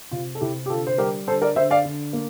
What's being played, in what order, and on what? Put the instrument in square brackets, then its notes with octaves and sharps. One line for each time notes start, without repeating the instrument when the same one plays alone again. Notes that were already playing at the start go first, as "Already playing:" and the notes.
[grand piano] C3 F4
A4
C3 E4 G4
G4
D3 F4 A4
C5
G3 G4 A#4
D3 A4 C5
A#4 D5
D3 C5 E5
D5 F5
D3
A#3